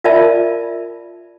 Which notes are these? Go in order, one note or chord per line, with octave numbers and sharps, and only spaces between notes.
F4 A#4 D5 E5 A5 B5